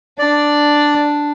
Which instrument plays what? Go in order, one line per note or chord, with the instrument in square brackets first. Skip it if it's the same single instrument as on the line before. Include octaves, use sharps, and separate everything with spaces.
[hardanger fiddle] D4 [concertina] D5